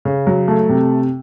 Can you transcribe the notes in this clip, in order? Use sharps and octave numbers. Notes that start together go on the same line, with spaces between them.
C#3
F#3
A3
C3